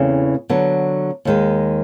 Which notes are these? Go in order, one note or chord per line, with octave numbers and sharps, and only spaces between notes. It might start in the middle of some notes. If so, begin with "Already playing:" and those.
Already playing: E2 C#3 E3 A3 C4
D3 F#3 B3
D#2 D#3 G#3